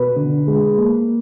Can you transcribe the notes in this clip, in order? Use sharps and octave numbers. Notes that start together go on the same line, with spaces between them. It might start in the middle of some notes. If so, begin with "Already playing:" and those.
Already playing: B2 B4
D3
G#3
A#3